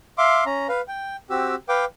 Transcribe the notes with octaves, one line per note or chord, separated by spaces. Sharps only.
E5 F5 C6 D6
C#4 A#5
B4 F5
G5
C4 F#4 G4 E6
B4 F5 G5 D6